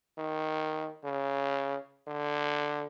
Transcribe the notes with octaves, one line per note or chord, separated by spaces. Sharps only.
D#3
C#3
D3